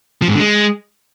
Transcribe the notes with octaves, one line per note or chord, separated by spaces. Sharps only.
F3
G#2
D3
G#3